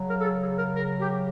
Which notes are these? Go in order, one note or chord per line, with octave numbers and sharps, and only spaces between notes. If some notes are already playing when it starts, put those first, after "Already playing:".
Already playing: C#3 F#3
A#4
A4
G#4
G#4
A#4
A#4
G4